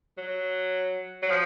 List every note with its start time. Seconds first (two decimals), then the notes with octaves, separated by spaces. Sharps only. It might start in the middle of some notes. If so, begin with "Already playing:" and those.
0.18 F#3
1.22 F#3
1.30 F3